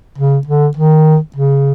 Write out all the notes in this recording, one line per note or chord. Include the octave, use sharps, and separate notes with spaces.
C#3
D3
D#3
C#3